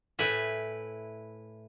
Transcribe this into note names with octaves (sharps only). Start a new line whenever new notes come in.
A2 E4 B4 G#5